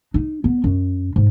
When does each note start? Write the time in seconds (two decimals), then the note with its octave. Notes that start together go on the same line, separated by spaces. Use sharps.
0.14 D#4
0.44 B3
0.64 F#2
1.16 G#2